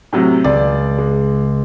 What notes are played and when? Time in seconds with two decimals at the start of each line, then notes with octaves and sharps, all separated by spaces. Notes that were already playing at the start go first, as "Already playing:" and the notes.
0.13 A2 C3 F#3
0.44 C#2 D5
0.98 G#3